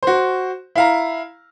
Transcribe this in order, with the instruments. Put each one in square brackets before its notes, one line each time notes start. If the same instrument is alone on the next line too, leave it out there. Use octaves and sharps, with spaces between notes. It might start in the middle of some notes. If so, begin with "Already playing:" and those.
[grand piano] F#4 C5
E4 F5 A#5